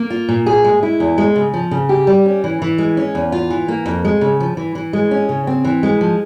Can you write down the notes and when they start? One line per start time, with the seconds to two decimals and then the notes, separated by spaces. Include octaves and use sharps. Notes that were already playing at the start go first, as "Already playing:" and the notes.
Already playing: A#3
0.10 F4
0.29 A#2
0.46 G#4
0.64 G#3
0.83 E4
1.00 E2
1.18 G#3
1.36 C#3
1.54 F3
1.71 C#3
1.89 G4
2.07 G3
2.25 C#4
2.44 E3
2.62 E3
2.78 G#3
2.97 C#4
3.15 E2
3.32 F4
3.50 E3
3.68 A#3
3.86 F2
4.05 G#3
4.21 C#3
4.40 F3
4.57 E3
4.75 E3
4.93 G#3
5.11 C#4
5.29 C#3
5.47 C4
5.65 E3
5.83 G#3
6.01 F3